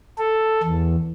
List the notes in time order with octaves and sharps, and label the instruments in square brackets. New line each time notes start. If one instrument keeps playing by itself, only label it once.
[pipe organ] A4
E2